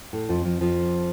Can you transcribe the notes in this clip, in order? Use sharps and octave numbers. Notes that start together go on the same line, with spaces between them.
A2 A3
F2 F3
F2 F3
F2 F3